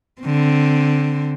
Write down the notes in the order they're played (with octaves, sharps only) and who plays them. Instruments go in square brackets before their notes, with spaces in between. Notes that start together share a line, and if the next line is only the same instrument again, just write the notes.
[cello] D3 C4